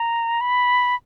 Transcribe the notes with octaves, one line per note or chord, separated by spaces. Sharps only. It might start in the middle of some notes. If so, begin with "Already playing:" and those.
Already playing: A#5
B5